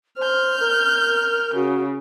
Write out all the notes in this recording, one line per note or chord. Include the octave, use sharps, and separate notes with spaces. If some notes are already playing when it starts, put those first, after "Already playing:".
C5 F6 G6
A#4
C#3 F#4